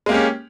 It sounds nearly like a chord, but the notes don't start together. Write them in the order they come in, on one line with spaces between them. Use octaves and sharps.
G#3 A#3 G4 C#4